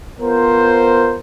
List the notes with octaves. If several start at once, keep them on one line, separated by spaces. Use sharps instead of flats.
B3 F4 A#4 C5